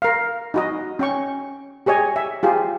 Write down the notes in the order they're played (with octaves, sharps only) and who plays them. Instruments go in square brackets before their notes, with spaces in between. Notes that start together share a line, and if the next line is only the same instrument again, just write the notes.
[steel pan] A#4 F5
D#4 F#4 D#5
C#4 G5 C#6
G4 G#4 C#5 D#5 G#5
E5
F4 G4 G#4